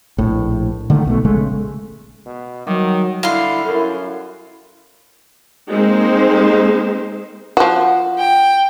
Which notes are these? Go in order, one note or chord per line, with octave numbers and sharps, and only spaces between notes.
A#1 A2
D3 D#3 A3
B1 B2 A3
A#1 C#3 G#3 A3
B2
D#3 F#3 G3 D6
D3 E4 F5 C6
F#2 A4 A#4
G#3 A#3 C4 D#4 C5
F3 F#4
G5